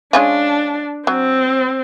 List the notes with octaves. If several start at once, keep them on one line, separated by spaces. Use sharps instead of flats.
G#3 C#4 D4 F4
F#3 C4